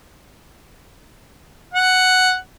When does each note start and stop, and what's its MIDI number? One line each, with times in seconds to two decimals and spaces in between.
1.74 2.36 78